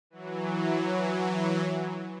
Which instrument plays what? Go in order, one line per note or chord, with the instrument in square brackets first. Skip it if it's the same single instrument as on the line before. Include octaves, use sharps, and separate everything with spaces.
[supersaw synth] E3 F#3